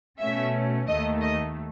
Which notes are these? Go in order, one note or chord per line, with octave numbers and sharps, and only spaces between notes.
B2 A3 C#4 E5
D#2 D#3 A3 D#5
D#5